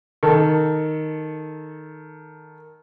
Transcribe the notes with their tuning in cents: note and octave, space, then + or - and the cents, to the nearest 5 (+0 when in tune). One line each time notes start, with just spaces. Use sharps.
D#3 +0 A4 +0